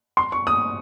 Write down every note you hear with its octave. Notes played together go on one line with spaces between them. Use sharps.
C6
C#6
D#6